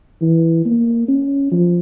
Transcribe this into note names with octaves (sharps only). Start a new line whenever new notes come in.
E3
A#3
C#4
F3